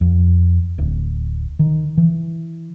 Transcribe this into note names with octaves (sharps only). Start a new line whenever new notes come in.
F2
D1
D#3
E3